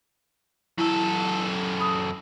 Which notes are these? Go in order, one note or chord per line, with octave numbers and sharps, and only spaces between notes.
F#2 E4 A4
B5 D#6